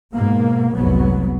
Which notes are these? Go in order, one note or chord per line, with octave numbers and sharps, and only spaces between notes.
G#2 B2 A#3
F1 C2 G#2 F#3 B3